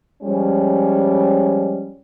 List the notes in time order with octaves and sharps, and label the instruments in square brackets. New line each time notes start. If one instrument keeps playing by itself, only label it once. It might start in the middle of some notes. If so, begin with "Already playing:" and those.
[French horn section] F3 G3 G#3 C#4